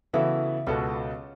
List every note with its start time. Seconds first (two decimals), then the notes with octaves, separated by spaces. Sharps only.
0.13 C#3 E3 B3 E4 F#4 A4
0.66 C#2 B2 B3 C#4 F#4 A4